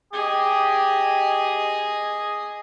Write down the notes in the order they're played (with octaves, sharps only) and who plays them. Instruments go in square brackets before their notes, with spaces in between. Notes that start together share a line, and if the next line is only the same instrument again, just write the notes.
[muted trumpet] G4 [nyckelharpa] G#4 D#5